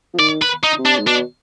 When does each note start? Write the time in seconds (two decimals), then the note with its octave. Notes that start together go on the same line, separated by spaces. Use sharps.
0.14 F3
0.19 D#3 D5
0.42 B4
0.64 D#4
0.78 C3
0.86 D4
0.99 G#2
1.07 B2 D4